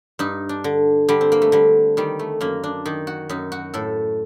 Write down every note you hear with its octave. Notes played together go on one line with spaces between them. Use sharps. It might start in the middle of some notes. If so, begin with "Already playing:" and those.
G2 D#4
D4
D3
D3 G3
C4
A#3
A3
D3 G3
D#3 G3
A3
F#2 A#3
D4
D#3 D#4
F#4
F#2 D#4
F#4
A2 A4